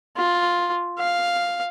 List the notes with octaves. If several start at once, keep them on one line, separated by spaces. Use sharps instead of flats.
F4
F5